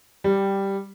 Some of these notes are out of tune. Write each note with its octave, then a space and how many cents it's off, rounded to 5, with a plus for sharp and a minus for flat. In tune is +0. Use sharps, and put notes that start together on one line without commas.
G3 +0 G4 -5